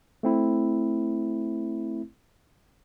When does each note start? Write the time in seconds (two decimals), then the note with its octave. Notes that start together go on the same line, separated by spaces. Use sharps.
0.23 A3 C4 E4